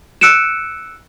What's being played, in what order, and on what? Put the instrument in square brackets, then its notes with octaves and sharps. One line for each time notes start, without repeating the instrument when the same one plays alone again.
[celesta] E6 F#6 C#7 D7 E7